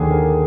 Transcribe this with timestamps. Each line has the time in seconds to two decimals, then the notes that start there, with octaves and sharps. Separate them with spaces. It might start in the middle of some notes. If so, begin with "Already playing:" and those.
Already playing: D#2 D3 G#4
0.11 D3 A#4